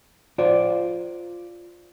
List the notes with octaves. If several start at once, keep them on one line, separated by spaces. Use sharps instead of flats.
F4 C5 D5